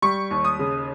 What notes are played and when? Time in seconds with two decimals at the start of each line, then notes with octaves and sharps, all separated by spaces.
0.02 G3 C#6
0.31 D#2
0.44 D#6
0.59 C#3